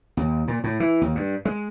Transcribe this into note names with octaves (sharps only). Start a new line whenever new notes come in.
D#2
A#2
A2
E3
D#2
G2
G#3